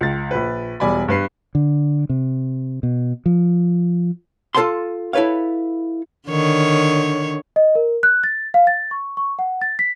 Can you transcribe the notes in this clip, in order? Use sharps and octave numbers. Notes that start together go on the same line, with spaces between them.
C#2 A6
A#1 B4
E1 G3 D5 G#5 B5
G2 B4 C7
D3
C3
B2
F3
F4 A4 C5 F5 A5 C6
E4 A4 B4 C#5 F5
D3 D#3 C#5
D#5
A#4
F#6
A6
F5
A6
C#6
C#6
F#5
A6
B6